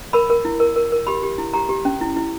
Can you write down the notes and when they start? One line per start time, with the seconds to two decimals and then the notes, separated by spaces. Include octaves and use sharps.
0.13 A#4 B5
0.30 A#4
0.45 E4
0.60 A#4
0.76 A#4
0.92 A#4
1.07 G4 B5
1.23 G4
1.38 E4
1.53 G4 A#5
1.69 G4
1.85 C#4
2.01 E4
2.16 E4